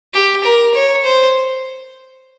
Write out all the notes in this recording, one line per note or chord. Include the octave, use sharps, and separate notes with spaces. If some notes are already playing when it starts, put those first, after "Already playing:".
G4
A#4
C#5
C5